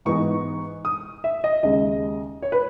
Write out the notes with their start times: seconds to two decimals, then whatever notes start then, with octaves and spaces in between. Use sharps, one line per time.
0.05 G#2 E3 B3 D#4 C#6
0.85 D#6
1.24 E5
1.44 D#5
1.63 D#2 C#3 G#3 D#5
2.42 C#5
2.52 B4